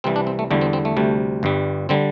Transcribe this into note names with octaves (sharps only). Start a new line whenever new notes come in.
C2 C3 E3 G3 C4
D4
C4
A3
E2 D3 G3 A3
C4
C4
A3
D2 C3 G3
G1 G2 G3
D3 G3 C4